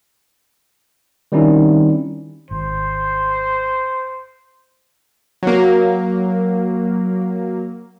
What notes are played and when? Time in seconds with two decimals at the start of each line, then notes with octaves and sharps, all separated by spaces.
1.32 D#3 G3 C4 C#4 D#4 E4
2.51 G#1 C5
5.43 F#3 A#3